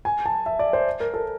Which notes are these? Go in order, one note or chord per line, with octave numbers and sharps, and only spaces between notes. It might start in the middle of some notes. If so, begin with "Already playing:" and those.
G#5
A5
E5
D5
C5
A#4
A4